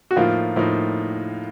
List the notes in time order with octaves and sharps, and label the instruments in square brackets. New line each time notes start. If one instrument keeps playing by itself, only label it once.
[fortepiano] F#4
[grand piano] A2 F3 A#3 D#4 [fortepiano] F4
[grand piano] A2 F3 A#3 D#4